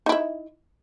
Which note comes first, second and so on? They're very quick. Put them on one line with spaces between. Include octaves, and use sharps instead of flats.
D#4 E4 E5